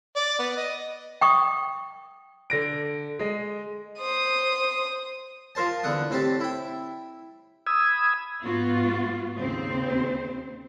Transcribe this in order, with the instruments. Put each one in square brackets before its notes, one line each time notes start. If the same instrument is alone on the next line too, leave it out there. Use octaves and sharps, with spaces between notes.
[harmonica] D5
B3
D#5
[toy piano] G5 C#6 D#6
[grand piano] D3 A#6 D7
G#3 D#5
[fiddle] C5 D#6
[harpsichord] F3 A#4 C5 A5
E2 D3 F#5 D#6
A2 C4 G4 A5
E4 G5
[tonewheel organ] B5 D#6 E6 G#6
[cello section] G#2 B3 F4 F#4
D#2 C#3 C4 C5